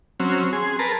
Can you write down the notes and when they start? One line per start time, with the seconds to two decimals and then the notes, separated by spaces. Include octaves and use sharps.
0.20 F#3 C4 C#4
0.53 G#4 C6
0.79 A#4 B4 A5